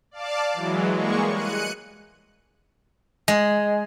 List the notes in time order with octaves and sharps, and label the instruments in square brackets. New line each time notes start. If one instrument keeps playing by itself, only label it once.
[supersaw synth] D5 F5 A5 D6
E3 F#3 G#3
G3 G#3 A#3 C#6
F#6 C#7 D#7
[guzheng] G#3